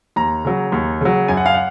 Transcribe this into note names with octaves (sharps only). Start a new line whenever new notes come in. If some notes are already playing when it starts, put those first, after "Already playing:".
D#2 A#5
C#3 F#3
D#2
C#3 F#3
F#2 G#5
F#5
F5
F#5